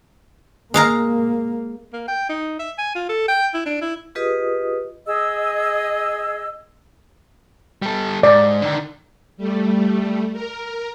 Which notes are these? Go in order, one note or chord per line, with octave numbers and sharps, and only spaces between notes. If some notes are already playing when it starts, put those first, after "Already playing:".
G#3 A#3 F5 A#5
A#3
G5
D#4
E5
G#5
F4
A4
G5
E4
D4
E4
F4 G4 G#4 B4 D#5 D#6
G#4 D#5 E6
G3 A4
G#2 D5
D3 D#3
G3 A3
A#4